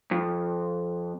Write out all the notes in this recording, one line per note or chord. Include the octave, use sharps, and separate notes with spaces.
F2